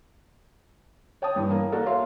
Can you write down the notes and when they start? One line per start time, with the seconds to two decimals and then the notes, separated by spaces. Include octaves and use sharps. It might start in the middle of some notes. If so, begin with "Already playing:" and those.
1.22 C#5 G5 A5 D#6
1.36 G2 E3
1.51 A#3
1.72 A#3 F#4 A4 D5
1.86 C#5 E5 F5 C6